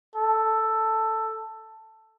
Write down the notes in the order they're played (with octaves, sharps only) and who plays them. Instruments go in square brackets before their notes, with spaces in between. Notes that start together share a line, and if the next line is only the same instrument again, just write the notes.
[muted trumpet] A4